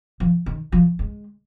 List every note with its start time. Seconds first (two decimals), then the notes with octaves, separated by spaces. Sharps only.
0.20 F3
0.46 D#3
0.72 F3
0.99 G#3